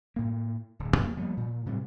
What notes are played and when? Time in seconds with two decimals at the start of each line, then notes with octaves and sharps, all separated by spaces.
0.16 A2 A#3
0.79 D1
0.97 F2 A#3
1.17 F3 G3 A#3 B3
1.37 A#2
1.66 A2 C3 F#3 G3